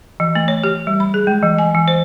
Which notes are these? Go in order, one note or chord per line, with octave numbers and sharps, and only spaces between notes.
E3
A3
C#5
G4
G3
B5
G#4
G#3
E3
G#5
E3
C5